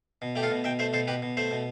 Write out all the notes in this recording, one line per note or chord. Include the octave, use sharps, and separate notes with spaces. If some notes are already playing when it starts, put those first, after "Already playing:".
B2
A3 G4
F4 A4
B2
B2 E5 G5
A3 C5 E5
B2 A4 C5
B2 G4 B4
B2
A3 C5 E5
B2